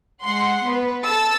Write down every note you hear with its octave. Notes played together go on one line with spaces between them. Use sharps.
G#3 F#5 C6
B3 B4
A4 A5 E6 A6